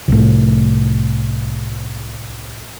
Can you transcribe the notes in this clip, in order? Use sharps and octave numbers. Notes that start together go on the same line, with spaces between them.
C2 A2